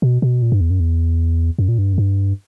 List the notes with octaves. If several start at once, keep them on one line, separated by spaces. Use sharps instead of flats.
B2
B2
A#2
G2
E2
F#2
E2
F#2
A#2
G2
F#2
G2